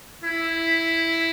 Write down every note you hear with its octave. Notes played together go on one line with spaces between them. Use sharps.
E4